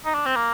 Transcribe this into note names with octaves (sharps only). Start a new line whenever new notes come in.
D#4
D4
C4
A#3